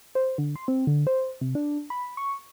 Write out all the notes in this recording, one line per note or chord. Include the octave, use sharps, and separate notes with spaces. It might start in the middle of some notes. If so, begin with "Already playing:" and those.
C5
D3
C6
C4
D3
C5
C3
D4
B5
C#6